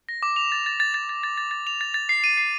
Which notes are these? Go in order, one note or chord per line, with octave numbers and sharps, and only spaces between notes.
A#6
D6
F7
A6
A6
A6
A6
A6
A6
A6
A6
F7
A6
A6
C7
D#7
C7